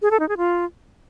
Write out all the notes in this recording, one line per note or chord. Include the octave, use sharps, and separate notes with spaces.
G#4
A4
D#4
G#4
F4